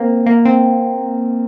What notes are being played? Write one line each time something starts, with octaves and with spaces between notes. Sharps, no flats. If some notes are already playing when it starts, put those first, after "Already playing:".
Already playing: A#3 C4
A#3
C4